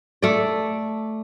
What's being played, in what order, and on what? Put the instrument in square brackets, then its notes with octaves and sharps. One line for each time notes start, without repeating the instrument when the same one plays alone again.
[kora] A3 D5